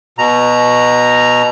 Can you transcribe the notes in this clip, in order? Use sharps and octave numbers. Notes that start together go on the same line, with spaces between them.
B2 A#5